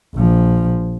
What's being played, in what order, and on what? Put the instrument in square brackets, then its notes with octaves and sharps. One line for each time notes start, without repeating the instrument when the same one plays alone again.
[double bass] A#1 F3